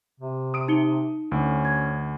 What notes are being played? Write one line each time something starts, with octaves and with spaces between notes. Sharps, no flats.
C3
D#6 D7
D#4 C#7 G7
D2 C#4
G#6